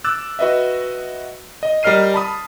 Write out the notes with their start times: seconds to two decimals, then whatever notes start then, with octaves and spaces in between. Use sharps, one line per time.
0.04 D6 E6 F#6 A6
0.39 F#4 B4 D#5 E5
1.63 D#5
1.83 G3 A#4 D#5 F6 C7 D#7
2.14 A5 B5 D#6